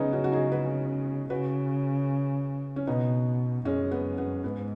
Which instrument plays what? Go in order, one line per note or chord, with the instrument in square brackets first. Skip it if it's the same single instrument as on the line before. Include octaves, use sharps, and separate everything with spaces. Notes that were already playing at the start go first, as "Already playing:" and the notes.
Already playing: [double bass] C#3 [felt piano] G#3 B3 C#4 D#4
[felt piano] C#4 F#4
F#4
D#4 G#4
F#4 B4
[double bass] C#3 [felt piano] F#4 B4
[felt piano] C#4
[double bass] B2 [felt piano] B3 D#4
[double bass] F#2 [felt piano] G#3 C#4
[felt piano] B3
B3
[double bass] G#2 [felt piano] B3